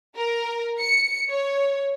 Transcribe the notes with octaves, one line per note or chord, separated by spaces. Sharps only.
A#4
C#7
C#5